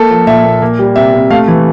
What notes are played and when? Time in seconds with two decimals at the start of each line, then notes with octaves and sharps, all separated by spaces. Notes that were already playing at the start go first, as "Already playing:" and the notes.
Already playing: A#3 A4
0.10 F3
0.27 A#2 E5
0.44 A#2
0.62 A#3
0.79 G3
0.96 C3 E5
1.14 C3
1.30 A3 F5
1.48 E3